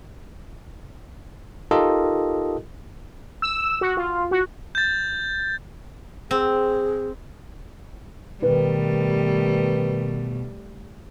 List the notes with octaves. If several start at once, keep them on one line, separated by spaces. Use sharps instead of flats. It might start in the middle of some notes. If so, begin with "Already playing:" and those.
D#4 F4 G4 A4 A#4 D#5
E6
F#4
F4
F#4
G6 A6
C4 G#4
B2 D#3 G3 A3 B4